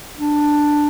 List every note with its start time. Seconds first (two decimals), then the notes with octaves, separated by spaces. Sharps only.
0.18 D4